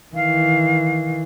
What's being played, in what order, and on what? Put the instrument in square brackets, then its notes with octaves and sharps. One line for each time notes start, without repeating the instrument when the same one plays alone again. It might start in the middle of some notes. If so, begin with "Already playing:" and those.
[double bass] D#3 E3 [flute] F5